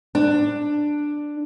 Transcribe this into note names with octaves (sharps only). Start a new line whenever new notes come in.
D4